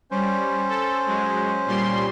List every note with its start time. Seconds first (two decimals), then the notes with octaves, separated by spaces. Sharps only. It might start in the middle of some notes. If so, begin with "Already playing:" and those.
0.11 G3 C#4 C5
0.68 A4
1.06 F#3 G#3
1.66 A#2 G3 C6